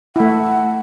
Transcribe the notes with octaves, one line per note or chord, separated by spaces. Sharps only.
A3 E4 F#5